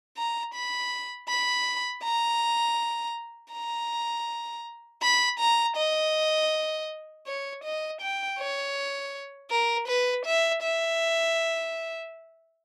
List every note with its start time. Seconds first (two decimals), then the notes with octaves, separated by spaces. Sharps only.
0.17 A#5
0.54 B5
1.28 B5
2.03 A#5
3.52 A#5
5.03 B5
5.40 A#5
5.77 D#5
7.27 C#5
7.64 D#5
8.01 G5
8.39 C#5
9.50 A#4
9.88 B4
10.26 E5
10.63 E5